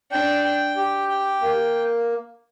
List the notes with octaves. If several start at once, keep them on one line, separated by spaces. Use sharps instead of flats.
D4 G5
G5
G4
G5
A#3